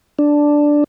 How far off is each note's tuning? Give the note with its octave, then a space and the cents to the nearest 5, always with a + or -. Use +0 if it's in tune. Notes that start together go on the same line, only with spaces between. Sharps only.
D4 +0